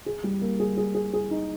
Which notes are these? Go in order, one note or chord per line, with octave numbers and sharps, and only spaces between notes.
G#4
G3
A#3
G#4
G#4
G#4
G#4
D#4